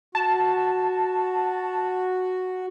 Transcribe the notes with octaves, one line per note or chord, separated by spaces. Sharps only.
F#4 A5